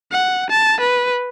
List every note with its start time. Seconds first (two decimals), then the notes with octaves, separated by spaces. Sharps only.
0.11 F#5
0.49 A5
0.80 B4